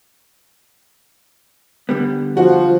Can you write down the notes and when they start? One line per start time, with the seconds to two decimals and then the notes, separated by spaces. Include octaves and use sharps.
1.89 D3 G3 B3
2.37 F3 F#4